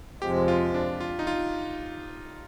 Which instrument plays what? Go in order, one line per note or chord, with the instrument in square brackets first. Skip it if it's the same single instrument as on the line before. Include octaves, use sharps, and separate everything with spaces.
[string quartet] F2 C3 F3 G#3 [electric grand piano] G4
[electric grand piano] F4
D4
F4
D#4
F4